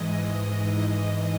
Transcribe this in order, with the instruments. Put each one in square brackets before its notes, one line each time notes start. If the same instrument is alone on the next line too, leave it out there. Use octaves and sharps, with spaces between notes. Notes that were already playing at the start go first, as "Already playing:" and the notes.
Already playing: [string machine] G#2 E3 G#3 D#5